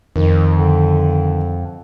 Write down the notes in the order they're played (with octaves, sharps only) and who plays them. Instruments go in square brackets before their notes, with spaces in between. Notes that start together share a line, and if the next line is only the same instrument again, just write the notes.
[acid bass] F2 [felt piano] D#3
[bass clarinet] D3